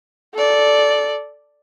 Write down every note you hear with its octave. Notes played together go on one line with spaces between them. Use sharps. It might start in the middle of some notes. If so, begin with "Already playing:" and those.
A4 D5